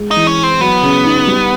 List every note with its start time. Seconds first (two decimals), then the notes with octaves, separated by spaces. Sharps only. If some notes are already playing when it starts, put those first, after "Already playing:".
Already playing: G#3
0.11 D#4
0.16 E3
0.27 C#4
0.39 C4 E4
0.60 F#3 B3
0.82 C#3
1.05 D#4
1.27 G3